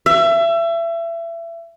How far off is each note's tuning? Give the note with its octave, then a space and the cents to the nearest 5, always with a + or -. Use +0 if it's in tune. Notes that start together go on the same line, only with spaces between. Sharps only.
E5 +30